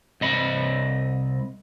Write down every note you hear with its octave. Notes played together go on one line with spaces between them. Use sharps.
C2 D#5 B5